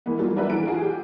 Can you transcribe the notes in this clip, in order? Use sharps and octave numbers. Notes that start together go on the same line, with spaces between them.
E3 G#3 A#3 B3
F#3 G3 A3 A#3 F4
G3 D4 F#4 A#4 B4 E5
E3 A4 D7
F4 F#4 G#4
G4